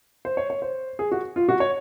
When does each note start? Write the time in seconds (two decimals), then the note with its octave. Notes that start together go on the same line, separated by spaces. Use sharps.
0.25 C5
0.37 C#5
0.50 C#5
0.62 C5
0.99 G#4
1.12 F#4
1.36 F4
1.49 F#4
1.60 C#5